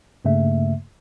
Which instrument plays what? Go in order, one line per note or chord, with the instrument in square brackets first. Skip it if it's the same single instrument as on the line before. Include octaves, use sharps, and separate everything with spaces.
[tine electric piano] G2 C#3 A3 A#3 E5